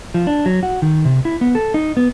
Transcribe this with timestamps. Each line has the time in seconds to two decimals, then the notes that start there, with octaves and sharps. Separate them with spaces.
0.14 F3
0.27 D4
0.46 F#3
0.63 F#4
0.82 D#3
1.05 C3
1.25 E4
1.41 B3
1.55 A4
1.74 D#4
1.97 B3